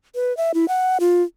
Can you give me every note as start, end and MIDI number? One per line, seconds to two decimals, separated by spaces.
0.15 0.35 71
0.37 0.52 76
0.54 0.68 64
0.68 0.98 78
1.00 1.23 65